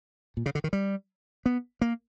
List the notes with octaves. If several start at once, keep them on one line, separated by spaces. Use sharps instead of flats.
A#2
C#3
D3
D#3
G3
B3
A#3